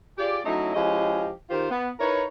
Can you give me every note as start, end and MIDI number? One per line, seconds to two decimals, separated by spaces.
0.18 0.40 65
0.18 0.40 67
0.18 0.40 68
0.18 0.40 74
0.44 0.73 54
0.44 0.73 57
0.44 0.73 61
0.44 0.73 63
0.44 0.73 64
0.74 1.30 53
0.74 1.30 56
0.74 1.30 61
0.74 1.30 64
0.74 1.30 67
0.74 1.30 75
1.50 1.70 51
1.50 1.70 65
1.50 1.70 67
1.50 1.70 72
1.71 1.89 59
1.99 2.25 63
1.99 2.25 64
1.99 2.25 70
1.99 2.25 71
1.99 2.25 73